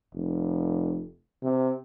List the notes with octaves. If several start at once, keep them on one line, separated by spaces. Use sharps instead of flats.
F1
C3